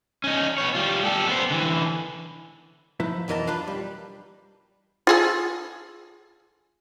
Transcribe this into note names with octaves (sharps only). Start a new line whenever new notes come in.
C#4 D#4
B3 C#5
G3 F4
G4 A4
B3 C5
D3 E3
F3 D#4 E4 B4
B1 F2 E3 A#4 D#5 A5
D4 F4 B4
G3
F4 G#4 A4